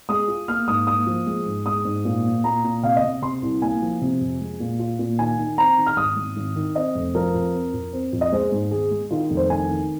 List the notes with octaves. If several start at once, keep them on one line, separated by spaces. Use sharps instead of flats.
G#3 D#6
F4
A#3 F6
G#2 D#6
A#3 D#6
F3
G#3
G#2
G#3 D#6
G#2
A#2
A#3
A#2 A#5
A#2
C3 F5
D#5
C3
C3 C6
C2
A#3 G#5
F3
C3
F2
G#3
A#2
F4
A#2
D#3 G#5
D#3
C4 A#5
D#3
F6
G#1 D#6
G#1
G#1
D#3
C4 D#5
F1
F3 A#4
F2
C4
F2
C4
F2
D#5
G#3 C5
G#2
G#1 G#4
G#3
D#3 F4
F1
C5
D#3 G#5
D#3